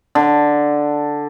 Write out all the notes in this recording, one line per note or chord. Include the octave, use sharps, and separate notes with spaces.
D3